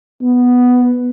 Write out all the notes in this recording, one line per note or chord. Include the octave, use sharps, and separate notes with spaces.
B3